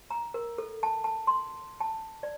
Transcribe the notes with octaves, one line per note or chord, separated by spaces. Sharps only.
A#5
A#4
A4
A5
A5
C6
A5
D5